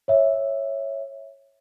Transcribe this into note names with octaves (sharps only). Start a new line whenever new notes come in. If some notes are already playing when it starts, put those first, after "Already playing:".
C#5 E5